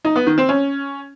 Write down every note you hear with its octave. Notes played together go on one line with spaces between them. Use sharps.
D#4
B3
D#3
C4
C#4